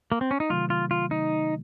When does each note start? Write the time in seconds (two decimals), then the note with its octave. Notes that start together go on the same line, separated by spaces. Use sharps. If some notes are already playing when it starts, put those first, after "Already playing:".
0.12 A#3
0.21 C4
0.31 C#4
0.40 D#4
0.50 C3 D#3 F#3 A3 F4
0.70 F4
0.91 F4
1.11 D#4